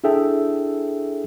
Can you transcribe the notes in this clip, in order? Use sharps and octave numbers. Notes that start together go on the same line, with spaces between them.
D4 E4 G#4 A4 E5 G5